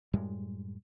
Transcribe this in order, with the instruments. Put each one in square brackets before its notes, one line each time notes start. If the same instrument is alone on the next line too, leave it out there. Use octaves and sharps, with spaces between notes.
[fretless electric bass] F#2 A2 G3 G#3